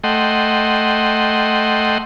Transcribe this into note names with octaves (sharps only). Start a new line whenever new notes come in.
A3 D#5 F#5 G5 C6